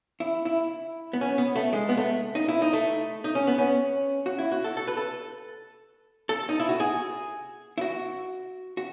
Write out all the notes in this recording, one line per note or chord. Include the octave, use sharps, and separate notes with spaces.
E4
E4
B3
C#4
B3
A3
G#3
B3
A3
D#4
E4
D#4
A3
D#4
C#4
B3
C#4
F#4
E4
F#4
A4
A4
B4
A4
A4
D#4
E4
F#4
G#4
E4
F#4
F#4